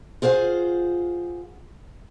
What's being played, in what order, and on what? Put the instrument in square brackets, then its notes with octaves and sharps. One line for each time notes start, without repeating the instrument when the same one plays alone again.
[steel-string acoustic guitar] F4 G#4 C5 F5 F#5